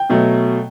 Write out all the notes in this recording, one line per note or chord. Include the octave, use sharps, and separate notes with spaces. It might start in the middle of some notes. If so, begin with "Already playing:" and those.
Already playing: G5
B2 F#3 A3